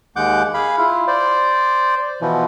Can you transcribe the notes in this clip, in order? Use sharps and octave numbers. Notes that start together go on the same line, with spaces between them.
D#2 G#3 F#5 D6 G6
G#4 F5 B5
E4 F4
C5 D5
B2 E3 F3